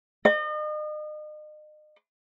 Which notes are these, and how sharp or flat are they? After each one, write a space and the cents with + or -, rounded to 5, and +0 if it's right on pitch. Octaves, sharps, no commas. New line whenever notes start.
D#5 -40